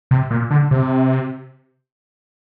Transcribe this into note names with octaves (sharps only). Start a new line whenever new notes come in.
C3
A#2
D3
C3